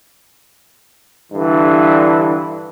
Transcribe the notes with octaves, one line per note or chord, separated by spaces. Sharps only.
G2 D3 E3